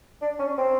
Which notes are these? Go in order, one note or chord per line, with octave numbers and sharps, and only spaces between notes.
D4
C#4
C4